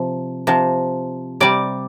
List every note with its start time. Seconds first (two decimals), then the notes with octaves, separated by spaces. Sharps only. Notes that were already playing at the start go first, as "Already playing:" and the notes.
Already playing: C3 F3
0.47 C3 F3
1.40 C3 G3 D5